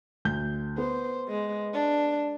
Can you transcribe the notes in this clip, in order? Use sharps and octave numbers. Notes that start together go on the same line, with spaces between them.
D2 G6
B3 C5
G#3
D4